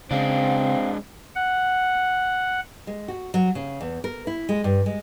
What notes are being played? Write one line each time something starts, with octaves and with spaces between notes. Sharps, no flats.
C#3 G#3 C4 D4 F5
F#5
G#3
F#4
F#3
C#3
E2
A#4
E4
G#3
G2
G#3